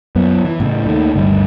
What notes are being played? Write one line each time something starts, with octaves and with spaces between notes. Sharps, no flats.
F#2 B3
E3
A2 C#3
D#2 D#3 A3
G1 D2 G2